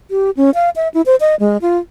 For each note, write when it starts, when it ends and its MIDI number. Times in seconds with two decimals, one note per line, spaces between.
0.11 0.31 67
0.37 0.50 61
0.55 0.70 77
0.76 0.88 76
0.94 1.02 64
1.06 1.16 72
1.20 1.35 75
1.40 1.57 56
1.62 1.78 65